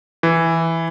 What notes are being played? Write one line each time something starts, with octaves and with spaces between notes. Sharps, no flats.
E3